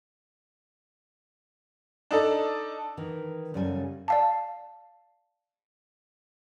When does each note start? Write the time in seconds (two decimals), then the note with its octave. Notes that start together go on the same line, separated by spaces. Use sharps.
2.11 D4 D#4 A4
2.97 D#3 E3
3.54 F#2 C#3 G3 A4 G#5
4.08 D5 F5 A5